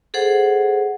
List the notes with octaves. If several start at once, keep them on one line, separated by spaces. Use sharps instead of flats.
G#4 A4 C5 F#5